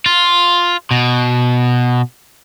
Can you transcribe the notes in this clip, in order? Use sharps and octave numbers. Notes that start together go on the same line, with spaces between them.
F4
B2